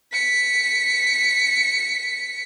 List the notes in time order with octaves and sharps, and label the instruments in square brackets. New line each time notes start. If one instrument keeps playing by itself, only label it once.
[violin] B6 C#7